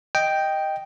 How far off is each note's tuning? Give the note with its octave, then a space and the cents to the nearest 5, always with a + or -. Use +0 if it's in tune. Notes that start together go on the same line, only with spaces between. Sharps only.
D#5 +0 G5 +0